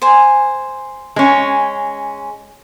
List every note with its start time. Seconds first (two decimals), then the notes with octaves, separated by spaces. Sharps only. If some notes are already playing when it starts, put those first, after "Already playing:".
0.02 C5 G#5
1.16 G#3 C#4